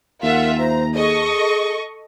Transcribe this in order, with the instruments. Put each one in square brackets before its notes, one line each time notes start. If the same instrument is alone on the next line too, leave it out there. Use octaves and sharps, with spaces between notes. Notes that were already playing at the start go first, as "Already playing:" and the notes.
[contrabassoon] D#2 [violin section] F4 E5 F#5 [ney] A#4
[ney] C5 [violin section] A#5
[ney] G#4 [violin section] A4 D#5 C#6